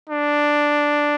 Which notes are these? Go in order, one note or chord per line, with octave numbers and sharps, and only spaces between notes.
D4